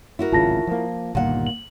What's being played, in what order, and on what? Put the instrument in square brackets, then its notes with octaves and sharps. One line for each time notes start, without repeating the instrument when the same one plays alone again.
[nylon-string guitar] E4 F#4 A#4
[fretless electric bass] D1 G#1 C#3 [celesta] F4 A5 A#6
[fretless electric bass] F3 A#3
[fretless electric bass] G1 D#2 [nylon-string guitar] A#2 F#5
[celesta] F#7